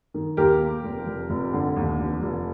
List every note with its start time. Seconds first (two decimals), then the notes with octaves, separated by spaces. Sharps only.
0.14 D#3
0.37 D#2 G4 A#4
0.60 A#3
0.84 F1
1.07 F1
1.29 F1
1.53 D3
1.76 D#2
1.99 F1
2.22 F1